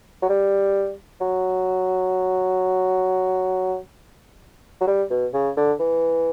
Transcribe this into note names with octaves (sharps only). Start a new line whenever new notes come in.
F#3
G3
F#3
F#3
G3
B2
C#3
D3
E3